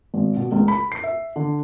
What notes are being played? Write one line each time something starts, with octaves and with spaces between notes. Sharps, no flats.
G#1
B2
C#2
B5
C7
E5
D3